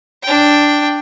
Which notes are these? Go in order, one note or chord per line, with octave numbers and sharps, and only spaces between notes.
D4 G5